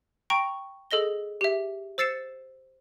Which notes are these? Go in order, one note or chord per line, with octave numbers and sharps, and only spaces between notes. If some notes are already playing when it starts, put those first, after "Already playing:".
G5 A#5 C#6 A#6 D7
G#4 A4 D#5 A#6 G7
G4 E5
C5 E6 A6 C7 C#7 E7